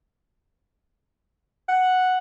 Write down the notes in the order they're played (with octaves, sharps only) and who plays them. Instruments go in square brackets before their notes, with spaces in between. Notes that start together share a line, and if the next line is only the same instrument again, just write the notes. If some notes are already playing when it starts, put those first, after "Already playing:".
[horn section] F#5